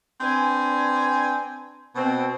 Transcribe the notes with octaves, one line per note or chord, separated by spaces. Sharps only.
C4 D4 B4 G#5
B2 C4